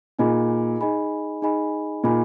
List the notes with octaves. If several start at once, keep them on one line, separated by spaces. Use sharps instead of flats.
A#2 D#4 G#4 D#5 G#5 B5
D#4 G#4 D#5 G#5 B5
D#4 G#4 D#5 G#5 B5
A#2 D#4 G#4 D#5 G#5 B5